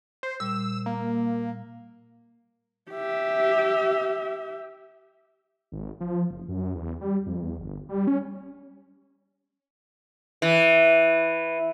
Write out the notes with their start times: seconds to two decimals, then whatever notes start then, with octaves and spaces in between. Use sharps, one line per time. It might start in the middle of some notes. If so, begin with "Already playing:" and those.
0.23 C5
0.40 A#2 G3 E6
0.86 A#3
2.91 G4 E5
5.72 G#1
6.01 F3
6.31 F#1
6.48 F#2
6.75 E2
7.01 G3
7.26 F2
7.42 E2
7.59 G1
7.89 G3
8.07 C#4
10.42 E3